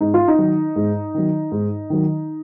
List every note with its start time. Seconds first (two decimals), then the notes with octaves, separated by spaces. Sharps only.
0.01 G#2 D#4
0.14 F4
0.28 D#4
0.38 D#3 F#3
0.76 G#2
1.14 D#3 F#3
1.52 G#2
1.90 D#3 F#3